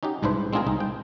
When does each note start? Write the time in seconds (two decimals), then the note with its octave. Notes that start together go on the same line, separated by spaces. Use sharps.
0.03 C#4 D#4 F#4 G4
0.22 C2 G#2 D4 E4 B4 C5
0.53 G#3 C4 D4 F4 G#4 A#4
0.67 C2 D#4
0.80 G5